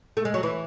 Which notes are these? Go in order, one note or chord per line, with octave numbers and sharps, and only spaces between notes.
A3
G#3
F#3
E3